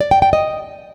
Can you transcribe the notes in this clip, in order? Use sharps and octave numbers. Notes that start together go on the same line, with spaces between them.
D5
G5
G5
D#5